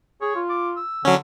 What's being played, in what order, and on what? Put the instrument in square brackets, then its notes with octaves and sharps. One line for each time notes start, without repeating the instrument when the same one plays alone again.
[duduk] G#4 [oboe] C#5
[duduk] F4
[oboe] D6
E6
[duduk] D3 [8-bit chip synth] F#3 C#4